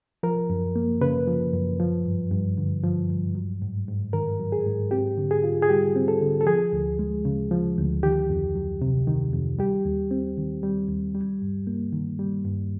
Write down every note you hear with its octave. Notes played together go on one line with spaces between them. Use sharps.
F3 A#4
F#2
A#3
C#3 B4
F3
F#2
F3
G2
G2
D3
F3
G2
F#3
G#2
G#2
D#3 A#4
F#3
G#4
G#2
C4 G4
D3
G#4
F4
G#4
G3 G4
C4
A4
D3
A4
F3 G#4
D2
G#3
C#3
F3
D2
D#3 G4
F2
F#3
C3
D#3
F2
G3 G4
D#2
C4
D#3
G3
D#2
G3
G2
A#3
D#3
G3
G2